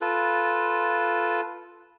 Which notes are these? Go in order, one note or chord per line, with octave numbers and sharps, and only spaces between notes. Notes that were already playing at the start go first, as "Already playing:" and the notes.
F4 A4 B4